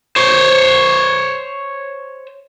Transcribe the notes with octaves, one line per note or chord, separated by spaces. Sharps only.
C5 C#5